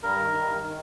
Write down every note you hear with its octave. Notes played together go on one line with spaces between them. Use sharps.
G2 A#4
D#3
G2
D#3